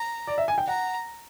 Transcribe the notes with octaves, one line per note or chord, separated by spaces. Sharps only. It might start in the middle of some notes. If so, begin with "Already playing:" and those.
Already playing: A#5
D5
E5
G#5
G5
F#5 A#5